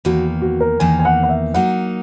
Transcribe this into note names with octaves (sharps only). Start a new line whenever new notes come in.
E2 D#3 A#3 F#4
F#4
A#4
E2 D#3 A#3 G#5
G#5
F#5
F#5
E5
F#3 A#3 D#4 F#5